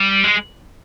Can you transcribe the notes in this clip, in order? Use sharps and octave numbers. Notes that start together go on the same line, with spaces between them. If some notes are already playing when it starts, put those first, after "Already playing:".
Already playing: G3
G#3